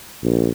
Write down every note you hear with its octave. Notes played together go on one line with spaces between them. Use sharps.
A#1